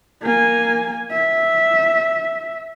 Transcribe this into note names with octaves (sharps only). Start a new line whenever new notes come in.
A#3 G#5
E5